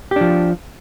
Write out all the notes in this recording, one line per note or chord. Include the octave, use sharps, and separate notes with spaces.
F3 D4 G4